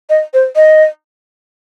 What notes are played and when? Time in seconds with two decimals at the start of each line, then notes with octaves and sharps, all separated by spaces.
0.10 D#5
0.34 C5
0.56 D#5